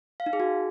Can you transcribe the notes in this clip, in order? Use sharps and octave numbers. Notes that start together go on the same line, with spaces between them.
F5
D#4
G#4
F#4